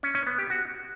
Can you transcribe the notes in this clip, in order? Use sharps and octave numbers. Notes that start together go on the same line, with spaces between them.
C#4
C#4
B3
G4
F#4